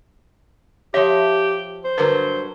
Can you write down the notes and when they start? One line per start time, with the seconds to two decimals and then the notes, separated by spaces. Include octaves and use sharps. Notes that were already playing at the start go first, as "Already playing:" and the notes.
0.94 F3 G4 C#5 E5
1.84 C5
1.98 G2 D3 F#3 A#4 B4